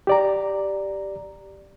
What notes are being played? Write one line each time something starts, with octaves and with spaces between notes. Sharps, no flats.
G4 D5 A#5